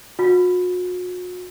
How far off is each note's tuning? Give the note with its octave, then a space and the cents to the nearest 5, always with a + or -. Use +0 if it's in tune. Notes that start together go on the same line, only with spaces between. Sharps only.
F#4 -40